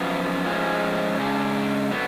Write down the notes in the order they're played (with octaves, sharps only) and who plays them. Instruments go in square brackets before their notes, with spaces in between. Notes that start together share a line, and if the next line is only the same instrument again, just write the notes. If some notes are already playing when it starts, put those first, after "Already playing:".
Already playing: [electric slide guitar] F#2 F3 B3 F4
A2 F3 G#3 C#4 F4
C#3 G#3 D4
D3 F#3 B3